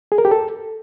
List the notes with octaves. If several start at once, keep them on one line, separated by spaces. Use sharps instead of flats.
G#4
A#4
G4
A4